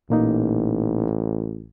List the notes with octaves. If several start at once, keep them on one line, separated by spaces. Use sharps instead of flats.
A1 A#2 A#3 D#4